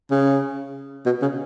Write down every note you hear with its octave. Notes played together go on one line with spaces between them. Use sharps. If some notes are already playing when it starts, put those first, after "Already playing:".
C#3
B2
C#3